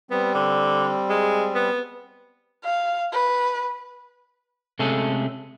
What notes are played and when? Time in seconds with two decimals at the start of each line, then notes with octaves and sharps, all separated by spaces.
0.11 G3 B3 C4
0.34 D3
1.09 G#3
1.55 B3
2.64 F5
3.13 B4
4.79 C3 G#3 A3 C#4 G#4 A4